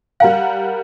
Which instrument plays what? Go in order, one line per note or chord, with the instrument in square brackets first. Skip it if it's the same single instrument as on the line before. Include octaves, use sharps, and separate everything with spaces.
[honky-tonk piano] G3 A#4 F#5 [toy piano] F5